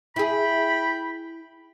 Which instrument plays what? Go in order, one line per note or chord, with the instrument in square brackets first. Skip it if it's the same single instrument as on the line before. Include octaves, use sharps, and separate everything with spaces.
[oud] E4 G#4 [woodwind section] G5 B5